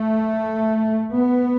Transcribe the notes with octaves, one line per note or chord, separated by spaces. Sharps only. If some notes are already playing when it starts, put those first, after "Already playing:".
Already playing: A3
B3